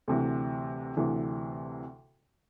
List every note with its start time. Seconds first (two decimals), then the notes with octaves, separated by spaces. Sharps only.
0.08 D2 C3 E3
0.97 D2 C3 E3